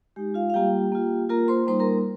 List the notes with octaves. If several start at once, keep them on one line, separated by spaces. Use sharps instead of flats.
G#3 D#4 G4
F4 F5
F5
G3 A#3 F4 G4 G5
A#3 F4
A#3 F4 A#4 A#5
C5 C6
G3 A#3 D#4 C5 C6
A#4 A#5